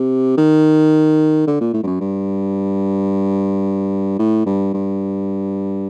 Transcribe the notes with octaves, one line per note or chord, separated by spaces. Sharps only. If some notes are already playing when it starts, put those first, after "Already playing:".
Already playing: C3
D#3
D3
A#2
A2
G2
F#2
G2
A2
G2
G2